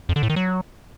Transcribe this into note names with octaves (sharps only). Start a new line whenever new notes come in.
F2
D3
A2
D#3
F#3